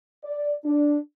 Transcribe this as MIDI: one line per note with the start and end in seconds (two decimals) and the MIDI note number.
0.24 0.53 74
0.64 0.98 62